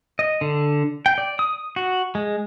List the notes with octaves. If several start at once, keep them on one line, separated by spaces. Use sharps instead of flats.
D#5
D3
G5
D5
D#6
F#4
G#3